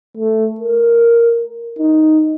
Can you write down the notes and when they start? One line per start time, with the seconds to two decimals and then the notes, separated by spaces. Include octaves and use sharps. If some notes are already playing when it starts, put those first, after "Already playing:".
0.17 A3
0.60 A#4
1.79 D#4